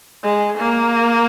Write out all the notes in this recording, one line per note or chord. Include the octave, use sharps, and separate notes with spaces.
G#3
A#3